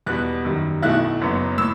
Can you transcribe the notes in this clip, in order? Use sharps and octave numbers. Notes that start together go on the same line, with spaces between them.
E2 B2 G3 B3 F#6
F#2 D#3 G3
B1 B2 A3 E4 F#6
F#1 F#2 F#3 B3
A2 E6